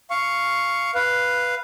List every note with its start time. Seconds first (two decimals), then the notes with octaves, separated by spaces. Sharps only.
0.10 F5 C#6
0.95 B4 F5